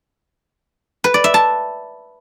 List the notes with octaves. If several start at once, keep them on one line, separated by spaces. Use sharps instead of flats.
B4
D5
E5
A5